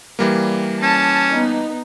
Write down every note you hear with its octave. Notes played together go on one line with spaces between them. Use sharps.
E3 G3 A#3
C#4 A5
B3 D#4